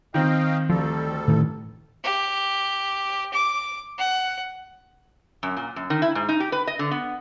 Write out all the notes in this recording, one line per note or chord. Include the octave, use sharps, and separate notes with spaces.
D#3 C4 D#5 F5 G5
D2 F3 G3 A4
A2 D#3 E3
G4
D6
F#5
F#2
A#2
F#2
D#3
E4
G#2
D#4
G4
B4
D#5
D3
B3